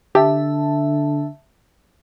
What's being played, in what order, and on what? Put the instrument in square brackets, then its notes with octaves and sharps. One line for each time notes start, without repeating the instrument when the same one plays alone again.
[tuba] D3 [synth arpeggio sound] G4 [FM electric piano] E5 A5